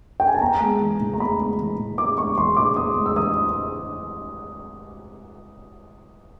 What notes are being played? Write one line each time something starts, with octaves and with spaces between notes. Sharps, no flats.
G5
G#5
A5
B3 A#5
G#3
E3
A2
A#5
B3 B5
G#3
E3
A2
B3 D6
G#3 C#6
E3 C6
A2 D6
B3 D#6
G#3
E6
E3 D#6